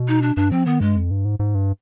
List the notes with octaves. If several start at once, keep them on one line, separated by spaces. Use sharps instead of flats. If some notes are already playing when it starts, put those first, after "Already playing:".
Already playing: B2
D#4
D4
G2 D4
F3 C4
D#3 B3
G2 G#3
F2
G2
G#2
G#2
G2